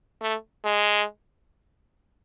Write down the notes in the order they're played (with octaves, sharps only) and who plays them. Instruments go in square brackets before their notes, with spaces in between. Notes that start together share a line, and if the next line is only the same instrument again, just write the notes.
[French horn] A3
G#3